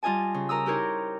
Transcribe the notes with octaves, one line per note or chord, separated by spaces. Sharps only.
G3 F4 D#5 G#5 A5
C#3
A#4 A#5 D#6 E6
D#4 E4 G4 A#4 C5 C#5